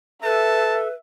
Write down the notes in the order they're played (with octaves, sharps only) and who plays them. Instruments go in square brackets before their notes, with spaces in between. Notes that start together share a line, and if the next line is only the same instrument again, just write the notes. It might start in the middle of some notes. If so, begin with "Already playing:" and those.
[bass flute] A4 [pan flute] B4 [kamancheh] E5 [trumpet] A5